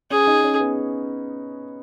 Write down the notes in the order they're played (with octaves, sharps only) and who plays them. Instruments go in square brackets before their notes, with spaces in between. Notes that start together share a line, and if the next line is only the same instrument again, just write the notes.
[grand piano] C#4 [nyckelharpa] G#4
[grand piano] D#4
C#4
B3